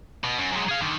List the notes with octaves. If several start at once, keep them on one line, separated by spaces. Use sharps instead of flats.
B2
F#2
F#2 G#3
G#4 F5
D3 D#3